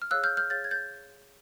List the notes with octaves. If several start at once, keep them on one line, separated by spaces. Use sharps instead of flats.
F6
G#4 C#5 F5 E6 F#6
F6 G6
F6 G6
G#4 C#5 F5 G6 A6
G#6
G6 A6